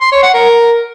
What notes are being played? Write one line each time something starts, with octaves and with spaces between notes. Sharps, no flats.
C6
C#5
F#5
A#4